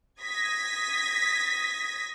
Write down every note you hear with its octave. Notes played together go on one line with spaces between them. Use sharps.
D#6 G#6 A#6 B6